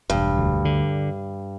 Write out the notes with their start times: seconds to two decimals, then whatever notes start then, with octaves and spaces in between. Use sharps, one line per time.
0.10 E1 G2
0.38 D2
0.65 D3